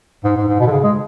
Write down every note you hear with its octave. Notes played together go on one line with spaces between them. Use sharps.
G#2
G#2
G#2
B2
D3
C#3
G#3